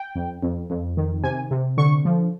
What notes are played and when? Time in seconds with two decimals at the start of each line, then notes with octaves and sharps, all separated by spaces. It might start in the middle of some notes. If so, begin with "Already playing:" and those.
Already playing: G5
0.15 F2
0.43 F2
0.70 F2
0.97 D#3
1.23 C3 G#5
1.51 C3
1.78 D3 C#6
2.05 F3